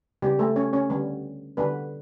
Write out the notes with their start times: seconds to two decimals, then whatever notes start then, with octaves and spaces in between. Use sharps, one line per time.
0.22 C#3 G3 B3 G4
0.39 A3 A4
0.56 C#4 C#5
0.73 C#4 C#5
0.90 D3 G3 B3
1.57 D3 G3 B3 B4